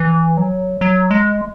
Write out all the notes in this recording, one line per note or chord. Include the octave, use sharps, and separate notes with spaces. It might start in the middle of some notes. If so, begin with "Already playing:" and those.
Already playing: E3
F#3
F#3
G#3